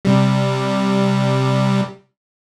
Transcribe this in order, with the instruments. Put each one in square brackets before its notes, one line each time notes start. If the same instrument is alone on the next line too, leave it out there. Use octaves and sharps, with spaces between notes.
[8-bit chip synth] C3 G3